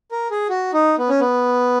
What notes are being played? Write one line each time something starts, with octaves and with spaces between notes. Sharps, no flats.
A#4
G#4
F#4
D#4
B3
C#4
B3